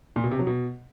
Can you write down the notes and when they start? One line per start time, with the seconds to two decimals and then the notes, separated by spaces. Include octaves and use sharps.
0.16 A#2
0.24 B2
0.31 C3
0.39 F#3
0.47 B2